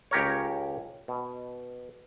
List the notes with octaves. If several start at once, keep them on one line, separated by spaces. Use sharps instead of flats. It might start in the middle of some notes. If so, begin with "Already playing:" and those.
C#2 G4 A#4 C#5
B2